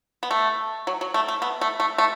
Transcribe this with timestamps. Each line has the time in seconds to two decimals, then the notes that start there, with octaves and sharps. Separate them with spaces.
0.23 B3
0.31 A3
0.87 F#3
1.01 F#3
1.14 A3
1.28 A3
1.42 B3
1.61 A3
1.80 A3
1.98 A3